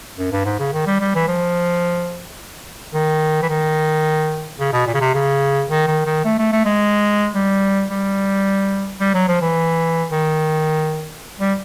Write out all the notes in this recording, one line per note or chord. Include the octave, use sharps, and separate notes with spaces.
F#2
G2
G#2
C#3
D#3
G3
G3
E3
F3
D#3
E3
D#3
C#3
B2
A#2
C#3
C3
C#3
D#3
D#3
D#3
A3
A3
A3
G#3
G3
G3
G3
F#3
F3
E3
D#3
G3